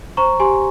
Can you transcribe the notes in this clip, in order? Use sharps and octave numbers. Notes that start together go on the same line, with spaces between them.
C5 A#5 C#6
G4 G#5 C6